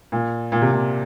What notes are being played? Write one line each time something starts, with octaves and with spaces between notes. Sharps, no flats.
A#2
A#2
C3
A#2